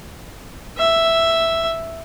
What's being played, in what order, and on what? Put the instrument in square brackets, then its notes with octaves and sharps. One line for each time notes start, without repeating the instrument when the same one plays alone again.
[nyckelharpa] E5